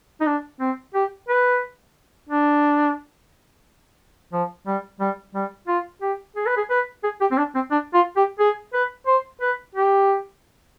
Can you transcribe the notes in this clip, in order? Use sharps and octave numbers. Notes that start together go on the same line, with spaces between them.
D#4
D4
C4
G4
B4
D4
F3
G3
G3
G3
F4
G4
G#4
B4
G#4
B4
G#4
G4
C4
D4
C4
D4
F4
G4
G#4
B4
C5
B4
G4